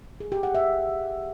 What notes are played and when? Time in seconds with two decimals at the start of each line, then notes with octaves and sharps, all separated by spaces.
0.20 G#4
0.32 G4
0.43 F#5
0.55 E5